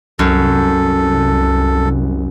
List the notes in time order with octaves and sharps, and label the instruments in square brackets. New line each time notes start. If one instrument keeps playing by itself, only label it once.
[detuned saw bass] C2 [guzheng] F#2 [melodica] A4